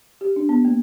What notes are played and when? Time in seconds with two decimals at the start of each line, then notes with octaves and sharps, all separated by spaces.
0.21 G4
0.36 D4
0.49 B3
0.65 A#3